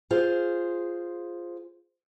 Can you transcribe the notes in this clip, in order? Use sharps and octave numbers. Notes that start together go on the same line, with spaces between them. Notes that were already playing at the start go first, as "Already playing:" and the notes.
F4 G#4 C5 F5